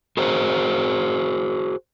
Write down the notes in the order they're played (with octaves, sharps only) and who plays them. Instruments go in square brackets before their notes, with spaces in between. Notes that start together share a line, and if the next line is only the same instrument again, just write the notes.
[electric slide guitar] F#4 G#4 A#4 C5